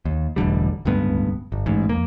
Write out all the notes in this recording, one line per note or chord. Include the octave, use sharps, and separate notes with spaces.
D#2
E1 A1 D3 G3
D1 C#2 G2 B3
G1
A1 G#2
F2 A#3